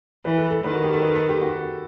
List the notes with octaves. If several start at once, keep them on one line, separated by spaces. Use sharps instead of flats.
E3 B4
A4
A4
D#3 B4
F#4
G4
A4
B4
A4
G4
F#4